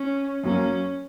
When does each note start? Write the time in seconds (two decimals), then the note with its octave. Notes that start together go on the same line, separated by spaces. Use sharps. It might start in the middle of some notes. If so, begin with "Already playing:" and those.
Already playing: C#4
0.44 F#2 F#3 A#3 C#4